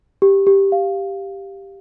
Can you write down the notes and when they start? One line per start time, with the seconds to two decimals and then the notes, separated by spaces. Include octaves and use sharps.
0.22 G4
0.47 G4
0.72 F5